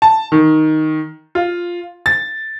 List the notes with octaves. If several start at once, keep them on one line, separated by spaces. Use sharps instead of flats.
A5
D#3
F4
A6